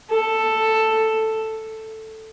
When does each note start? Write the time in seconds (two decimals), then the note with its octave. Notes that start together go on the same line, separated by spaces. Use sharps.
0.10 A4